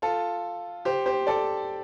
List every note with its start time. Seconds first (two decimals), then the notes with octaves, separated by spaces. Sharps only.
0.02 F4 A4
0.85 G4 C5
1.06 G4 C5
1.27 A4 D5